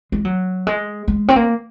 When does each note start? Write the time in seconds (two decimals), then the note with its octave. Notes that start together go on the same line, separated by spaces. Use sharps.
0.12 G#3
0.25 F#3
0.67 G#3
1.08 G#3
1.28 C4
1.36 A#3